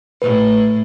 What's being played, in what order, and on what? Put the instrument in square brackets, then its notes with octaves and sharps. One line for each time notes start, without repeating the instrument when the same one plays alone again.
[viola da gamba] A2 [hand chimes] B4